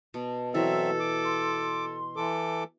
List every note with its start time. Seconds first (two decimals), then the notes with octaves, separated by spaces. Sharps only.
0.14 B2 A5
0.54 E3 F#3 C4 F#4 A4 E5
1.00 D6
1.24 C6
2.16 E3 A4 D6